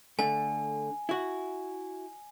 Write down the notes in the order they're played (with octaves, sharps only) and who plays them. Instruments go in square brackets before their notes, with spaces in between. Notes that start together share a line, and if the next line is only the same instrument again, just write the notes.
[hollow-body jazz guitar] D3 A3 [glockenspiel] G#5
[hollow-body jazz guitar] E4 F#4